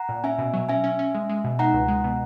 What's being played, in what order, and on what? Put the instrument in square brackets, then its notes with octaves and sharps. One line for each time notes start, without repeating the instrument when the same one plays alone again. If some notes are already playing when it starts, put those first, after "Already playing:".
Already playing: [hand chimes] F#5 A#5
[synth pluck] A#2
[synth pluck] C#4 [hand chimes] E5 G#5
[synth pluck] B2
F#3
[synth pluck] C#4 [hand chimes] E5 G#5
[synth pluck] C#4
C#4
G#3
G#3
B2
[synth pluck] D#4 [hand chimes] F#5 A#5
[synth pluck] C#2
G#3
B2